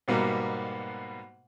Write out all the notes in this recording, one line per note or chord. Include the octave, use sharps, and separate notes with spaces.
G#2 B2 G3 A#3 B3